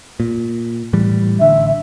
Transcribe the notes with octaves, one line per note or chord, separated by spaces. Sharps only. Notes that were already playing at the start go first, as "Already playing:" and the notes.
A#2
A2 E3 G3
A1 D3 E5